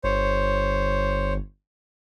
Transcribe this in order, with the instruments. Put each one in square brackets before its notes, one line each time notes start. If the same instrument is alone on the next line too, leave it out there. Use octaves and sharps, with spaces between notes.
[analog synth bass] G1 [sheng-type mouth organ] C5 C#5